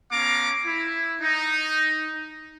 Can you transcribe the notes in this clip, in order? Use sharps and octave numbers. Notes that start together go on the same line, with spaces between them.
B3 C#4 A4 F5 A#5 D6
E4
D#4